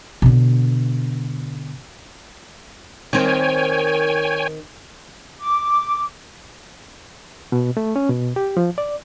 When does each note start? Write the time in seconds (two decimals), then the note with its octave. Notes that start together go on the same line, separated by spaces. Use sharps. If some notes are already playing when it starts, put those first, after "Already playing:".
0.22 B2 D3
3.13 D#3 C4 C#5 G5 G#5
5.40 D6
7.52 B2
7.77 A3
7.96 C#4
8.09 B2
8.36 G4
8.57 F3
8.78 D5